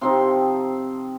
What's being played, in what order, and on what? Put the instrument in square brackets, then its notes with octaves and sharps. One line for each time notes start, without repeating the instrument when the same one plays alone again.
[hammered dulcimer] C3 F3 C4 D#4 C6